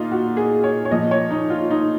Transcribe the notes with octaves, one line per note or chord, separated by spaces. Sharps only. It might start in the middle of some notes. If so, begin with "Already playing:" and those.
Already playing: A#2 D#4 F4
F#4
G#4
C#5
C#5
A#2 F3 D#5
C#5
D#4
F4
D#4